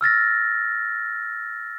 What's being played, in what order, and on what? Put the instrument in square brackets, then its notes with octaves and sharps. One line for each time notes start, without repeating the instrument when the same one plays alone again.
[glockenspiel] E6 F6 A6 A#6